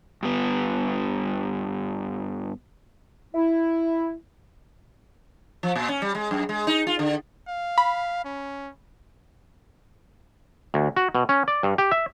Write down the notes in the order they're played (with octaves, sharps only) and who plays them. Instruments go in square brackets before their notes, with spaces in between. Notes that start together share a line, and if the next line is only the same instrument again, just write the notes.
[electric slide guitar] G2 B3
[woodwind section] E4
[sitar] F3
A#2
C#4
G3
G#3
F#2
G#3
D#4
F4
D3
[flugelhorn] F5
[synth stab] B5
[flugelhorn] C#4
[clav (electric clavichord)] D2
F#4
B2
C#4
D5
G2
G4
E5